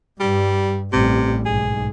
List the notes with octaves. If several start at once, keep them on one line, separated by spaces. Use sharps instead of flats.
G2 G3
A1 C3 G3
B1 G#2 G#4